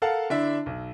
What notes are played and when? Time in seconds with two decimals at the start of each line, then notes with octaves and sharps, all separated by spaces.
0.02 A4 A#4 F5 F#5 A5
0.30 D3 D4 E4 E5
0.66 B1